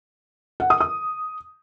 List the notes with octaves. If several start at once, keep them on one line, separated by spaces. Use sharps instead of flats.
F#5
D#6
D#6